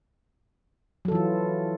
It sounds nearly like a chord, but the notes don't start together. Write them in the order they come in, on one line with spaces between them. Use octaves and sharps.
F#3 A4 E3 F4